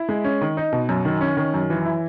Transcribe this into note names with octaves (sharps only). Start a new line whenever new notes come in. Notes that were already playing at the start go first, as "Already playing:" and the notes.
Already playing: E4
G#3
C#4
D#3
D#4
B2
F#2
D#3
C#4
D#3
F#2
E3
E4